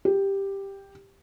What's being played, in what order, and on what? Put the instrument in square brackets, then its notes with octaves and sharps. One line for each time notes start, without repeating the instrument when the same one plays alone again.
[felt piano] G4